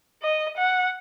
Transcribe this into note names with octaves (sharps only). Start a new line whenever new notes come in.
D#5
F#5